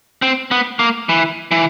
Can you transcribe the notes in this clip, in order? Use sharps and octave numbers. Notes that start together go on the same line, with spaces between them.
C4
B3
A#3
E3
E3